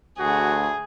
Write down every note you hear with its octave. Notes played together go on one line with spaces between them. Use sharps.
D2 F#4 G#4